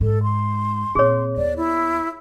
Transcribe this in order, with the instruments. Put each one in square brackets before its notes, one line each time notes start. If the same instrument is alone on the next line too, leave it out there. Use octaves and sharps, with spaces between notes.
[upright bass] G#2 [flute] A4
[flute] C6
[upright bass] A#2 C4 [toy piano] G#4 C#5
[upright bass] D#2 B3 [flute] D5
[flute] E4